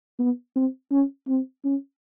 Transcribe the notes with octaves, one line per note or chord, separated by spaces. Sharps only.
B3
C4
C#4
C4
C#4